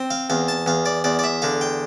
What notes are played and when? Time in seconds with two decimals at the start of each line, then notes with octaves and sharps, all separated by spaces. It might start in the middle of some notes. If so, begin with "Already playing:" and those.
Already playing: C4
0.11 F5
0.30 E2 F5
0.48 A5
0.66 E2 F5
0.86 D5
1.04 E2 D5
1.19 D5
1.24 E5
1.42 D3 F5
1.61 G5